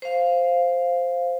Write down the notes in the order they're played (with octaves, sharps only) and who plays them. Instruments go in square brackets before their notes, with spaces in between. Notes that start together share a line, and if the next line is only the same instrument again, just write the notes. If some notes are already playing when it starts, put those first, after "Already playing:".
[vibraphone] C5 F5